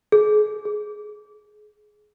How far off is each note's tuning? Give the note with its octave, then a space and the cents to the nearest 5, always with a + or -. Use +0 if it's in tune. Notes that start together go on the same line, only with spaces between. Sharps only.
G#4 +35
G#4 +20